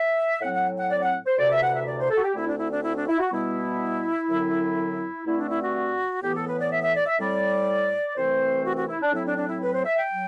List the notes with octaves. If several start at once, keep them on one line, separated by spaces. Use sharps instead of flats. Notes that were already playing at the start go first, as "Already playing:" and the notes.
Already playing: E5
A2 F#3 C4 F#5
F#5
F#5
D5
F#5
C5
D2 C3 E3 D5
E5
F#5
E5
D5
C5
A4
F#4
G4
D2 D3 A3 C4 E4
D4
E4
D4
E4
D4
E4
F#4
B2 G3 B3 E4
F#2 D3 F#3 C4
G2 D3 A3 C4 E4
D4
E4
F#4
A2 E3 B3 G4
A4
B4
D5
E5
E5
D5
E5
A2 G3 C4 D5
C2 C3 E3 A3 C4 C5
F#4
F#4
E4
D4
A2 F#3 C4 E4
D4
D4
E4
B4
C5
E5
G5
F#3